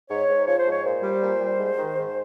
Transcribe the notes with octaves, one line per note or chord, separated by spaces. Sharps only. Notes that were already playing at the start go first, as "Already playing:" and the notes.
G#2 C#5
G#2
F3 C#5
C5
G#2
C#5
A#2 C5
G3
A#2
G3
G#2
D#3
G#2